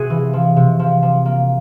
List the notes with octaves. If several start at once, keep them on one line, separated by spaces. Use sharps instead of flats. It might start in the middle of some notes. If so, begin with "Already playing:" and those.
Already playing: C3 F#4 G#4
E3
F3
C3
F3
F3
A#3